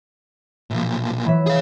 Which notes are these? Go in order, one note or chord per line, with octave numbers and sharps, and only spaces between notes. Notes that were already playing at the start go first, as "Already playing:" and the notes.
B1 A#2 F3 A3
E3 F#3 E5
G#4 F5